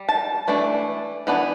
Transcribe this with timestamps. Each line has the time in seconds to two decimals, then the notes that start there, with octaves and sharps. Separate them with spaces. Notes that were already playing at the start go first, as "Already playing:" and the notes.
Already playing: G3
0.09 A5
0.47 E3 A3 D4
1.27 E3 B3 D4